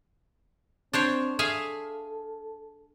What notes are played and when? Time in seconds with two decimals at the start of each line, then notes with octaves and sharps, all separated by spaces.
0.93 C4 D4 C5 C#5
1.39 G#4 A4 E5 F5